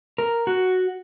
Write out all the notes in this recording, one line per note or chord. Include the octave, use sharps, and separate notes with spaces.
A#4
F#4